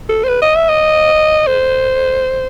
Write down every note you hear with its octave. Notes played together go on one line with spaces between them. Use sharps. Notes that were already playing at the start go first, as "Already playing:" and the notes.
A4
C5
B4
D#5
E5
D#5
C5